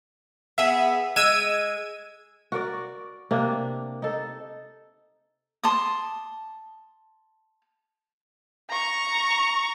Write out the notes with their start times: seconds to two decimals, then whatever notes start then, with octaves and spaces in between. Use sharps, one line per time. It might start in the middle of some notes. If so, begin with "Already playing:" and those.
0.58 B3 G#4 E5
1.16 G#3 E6 G#6 D#7
2.52 F#4 A#4 D5
3.31 C3 A#3 D4
4.02 D#4 A4
5.64 A5 C6 D6 D#6
8.70 A#5 C#6